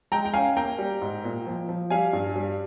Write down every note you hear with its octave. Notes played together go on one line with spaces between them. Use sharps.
G#3 G5 A#5
G5
C#4 F5 G#5
A#3 G5 A#5
G3
G#2
A#2
F3
F3
G3 F5 G#5
G2
G3